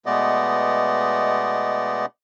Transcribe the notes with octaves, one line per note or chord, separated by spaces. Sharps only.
B2 G#3 A3 B3 D5 D#5